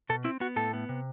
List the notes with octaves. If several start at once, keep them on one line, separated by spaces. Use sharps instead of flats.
B2 A4
C4 E4
B3 F#4
A2 A4
B3
C3